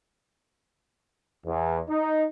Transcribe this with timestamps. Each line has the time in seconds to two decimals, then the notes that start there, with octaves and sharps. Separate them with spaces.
1.46 E2
1.89 D#4